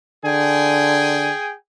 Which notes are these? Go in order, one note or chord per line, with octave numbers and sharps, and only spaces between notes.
D3 G#4 G5 G#5